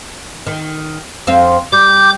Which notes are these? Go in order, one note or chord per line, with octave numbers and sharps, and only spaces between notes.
D#3
F2 C4 F5
G3 D6 G6